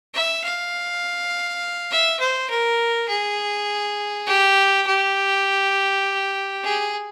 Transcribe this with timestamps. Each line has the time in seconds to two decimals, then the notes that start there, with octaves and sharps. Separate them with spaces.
0.14 E5
0.44 F5
1.91 E5
2.20 C5
2.50 A#4
3.08 G#4
4.26 G4
4.86 G4
6.64 G#4